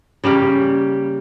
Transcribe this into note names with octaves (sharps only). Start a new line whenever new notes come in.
C#3 G3 A#3 G4